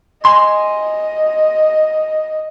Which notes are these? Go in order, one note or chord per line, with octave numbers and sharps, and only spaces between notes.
D#5 G#5 C6